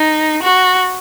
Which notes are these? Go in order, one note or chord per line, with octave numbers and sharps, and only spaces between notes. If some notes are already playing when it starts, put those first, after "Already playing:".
Already playing: D#4
F#4